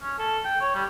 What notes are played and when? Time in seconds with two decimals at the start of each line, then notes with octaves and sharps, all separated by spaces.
0.02 C#4
0.19 A4
0.44 G5
0.61 C#5
0.75 G3